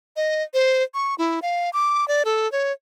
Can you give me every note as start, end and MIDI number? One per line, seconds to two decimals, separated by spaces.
0.16 0.43 75
0.54 0.83 72
0.94 1.15 85
1.18 1.40 64
1.42 1.70 77
1.73 2.07 86
2.08 2.23 74
2.25 2.50 69
2.52 2.72 73